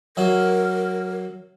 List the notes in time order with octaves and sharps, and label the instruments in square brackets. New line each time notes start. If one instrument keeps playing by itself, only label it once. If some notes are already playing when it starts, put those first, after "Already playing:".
[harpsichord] F#3 E5 [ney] A#4